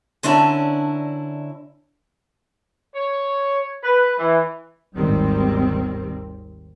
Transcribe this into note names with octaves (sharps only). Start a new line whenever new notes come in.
D3 C#4 D4 E4 A#4 E5
C#5
B4
E3
G#1 D#2 D#3 G3 C4